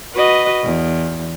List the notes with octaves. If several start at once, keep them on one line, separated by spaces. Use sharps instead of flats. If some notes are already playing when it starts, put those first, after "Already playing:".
F#4 B4 D#5
E2